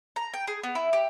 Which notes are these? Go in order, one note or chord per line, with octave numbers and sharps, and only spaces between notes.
A#5
G5
G#4
B3
E4
G4